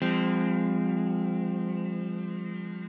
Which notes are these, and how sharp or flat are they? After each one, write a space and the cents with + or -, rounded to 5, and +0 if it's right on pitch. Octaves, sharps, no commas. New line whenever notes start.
F3 +0 G#3 -40 C4 -20